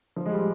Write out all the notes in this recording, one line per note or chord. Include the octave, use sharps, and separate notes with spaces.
F3
G#3
G3